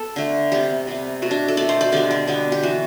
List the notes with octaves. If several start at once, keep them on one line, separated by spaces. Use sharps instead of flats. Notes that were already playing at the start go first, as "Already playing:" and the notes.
Already playing: B3 A4
D3 A3
C3 G3 B3 G4
C3 G3 B3
B2 A3 F#4
D4
A4
B2 A3 D5
C5
D5
D3 G3 B3 D5
D5
D3 G3 B3
G4
E3 B3 F#4